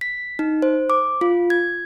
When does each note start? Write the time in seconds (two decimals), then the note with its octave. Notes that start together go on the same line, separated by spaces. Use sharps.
0.01 B6
0.39 D#4
0.62 C5
0.90 D6
1.21 F4
1.50 G#6